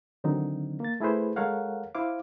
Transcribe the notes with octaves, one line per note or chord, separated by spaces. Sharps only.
D3 D#3 F#3 C4 D#4
A#3 A6
A3 E4 G#4 B4 C5
G#3 A4 A#4 C#5 F5 F#5
E4 C5 F5 D6